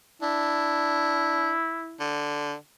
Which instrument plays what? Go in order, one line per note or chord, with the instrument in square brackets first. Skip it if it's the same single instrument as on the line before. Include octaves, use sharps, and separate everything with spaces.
[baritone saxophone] D4 [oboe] E4
[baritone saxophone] D3